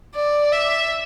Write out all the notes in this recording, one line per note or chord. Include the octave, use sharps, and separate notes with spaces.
D5
E5